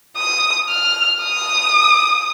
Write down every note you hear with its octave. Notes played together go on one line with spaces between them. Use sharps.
D#6
F6
D#6